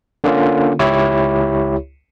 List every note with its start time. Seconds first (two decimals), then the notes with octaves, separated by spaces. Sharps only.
0.24 D3 A#3 C#4 F4
0.79 C#2 E4 G4 C#5